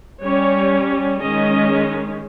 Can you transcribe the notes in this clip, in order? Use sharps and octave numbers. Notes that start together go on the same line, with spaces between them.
G3 C#4 C#5
D#3 G#3 C#4 D#5